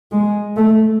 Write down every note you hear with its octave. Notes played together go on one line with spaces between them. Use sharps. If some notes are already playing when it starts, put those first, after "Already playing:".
G#3
A3